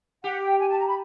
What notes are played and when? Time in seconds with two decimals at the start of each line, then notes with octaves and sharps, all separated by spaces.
0.24 G4 F#5
0.43 G5
0.60 G#5
0.70 A5
0.79 A#5
0.88 B5